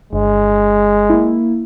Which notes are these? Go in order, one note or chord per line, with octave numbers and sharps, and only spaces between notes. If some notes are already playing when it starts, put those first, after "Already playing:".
G1 G#3
A#3 E4